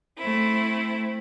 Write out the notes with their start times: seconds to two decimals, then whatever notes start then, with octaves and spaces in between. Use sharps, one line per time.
0.18 A3 C4 E4